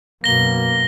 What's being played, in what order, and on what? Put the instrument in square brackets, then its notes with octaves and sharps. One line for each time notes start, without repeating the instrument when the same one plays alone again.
[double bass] F#2 B2 [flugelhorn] A#3 [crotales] A#6 G7